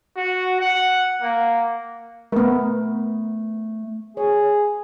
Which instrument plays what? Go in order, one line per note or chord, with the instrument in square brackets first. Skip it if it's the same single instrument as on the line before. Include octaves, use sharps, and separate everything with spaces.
[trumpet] F#4
F#5
A#3
[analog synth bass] A3 [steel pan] B3 A#4
[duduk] G#4 [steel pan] C#5